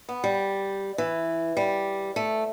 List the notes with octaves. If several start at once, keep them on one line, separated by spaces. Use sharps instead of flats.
B3
G3
E3
G3
A3